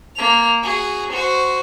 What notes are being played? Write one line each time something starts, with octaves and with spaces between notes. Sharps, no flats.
A#3 F7
F#4 G#4
F#4 C5